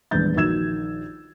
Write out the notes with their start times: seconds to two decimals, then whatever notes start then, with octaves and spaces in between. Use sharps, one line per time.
0.11 D#1 E2 G#3 D4 G6 A6
0.36 A#1 D#3 F#4 E6 G#6 E7